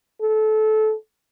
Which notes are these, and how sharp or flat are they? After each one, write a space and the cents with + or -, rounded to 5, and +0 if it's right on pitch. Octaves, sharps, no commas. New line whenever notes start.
A4 -20